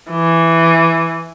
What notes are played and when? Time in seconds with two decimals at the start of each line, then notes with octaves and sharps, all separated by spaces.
0.11 E3